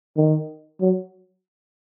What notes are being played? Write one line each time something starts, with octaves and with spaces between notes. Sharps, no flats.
D#3
F#3